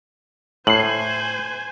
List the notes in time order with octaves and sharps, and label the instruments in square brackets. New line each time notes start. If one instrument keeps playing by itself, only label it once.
[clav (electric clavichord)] A2 [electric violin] C5 G#5 [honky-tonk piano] C7 F#7